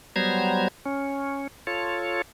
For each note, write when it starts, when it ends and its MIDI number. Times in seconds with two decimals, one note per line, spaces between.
0.16 0.68 54
0.16 0.68 55
0.16 0.68 59
0.16 0.68 72
0.16 0.68 82
0.16 0.68 92
0.86 1.47 61
1.67 2.22 65
1.67 2.22 69
1.67 2.22 73